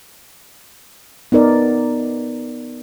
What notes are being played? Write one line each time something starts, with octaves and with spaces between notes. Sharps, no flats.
B3 D#4 A#4 D5